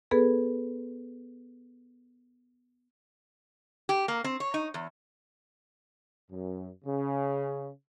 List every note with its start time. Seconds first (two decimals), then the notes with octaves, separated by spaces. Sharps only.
0.11 B3 G#4 A4 B4
3.89 G4
4.08 A#3
4.24 C4
4.40 C#5
4.54 D#4
4.74 E2
6.30 F#2
6.85 C#3